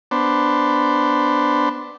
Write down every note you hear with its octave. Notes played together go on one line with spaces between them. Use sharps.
B3 D4 C5